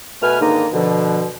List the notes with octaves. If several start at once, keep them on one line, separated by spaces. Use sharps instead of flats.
B2 A3 B4 G#5 F6
G#2 D3 D#3 A#3 D#4 A#5
B2 D3 F3